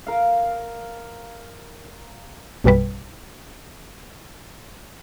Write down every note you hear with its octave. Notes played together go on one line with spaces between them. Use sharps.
A#4 F5
A#1 F#2 B2 G3 B4